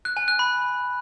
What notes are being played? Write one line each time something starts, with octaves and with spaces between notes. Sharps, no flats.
F#6
G#5
F#6
B5